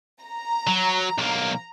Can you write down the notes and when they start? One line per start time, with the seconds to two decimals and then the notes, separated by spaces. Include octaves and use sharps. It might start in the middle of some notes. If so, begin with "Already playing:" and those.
0.23 A#5
0.67 F#3
1.18 B1 A#3